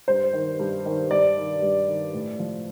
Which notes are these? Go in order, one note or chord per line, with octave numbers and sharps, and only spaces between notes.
G2 C5
D#3
G2
D#3
G2 D5
D#3
G2
D#3
A2
F3